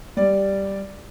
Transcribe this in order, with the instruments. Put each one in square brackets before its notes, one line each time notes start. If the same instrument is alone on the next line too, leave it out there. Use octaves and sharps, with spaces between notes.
[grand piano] G3 D5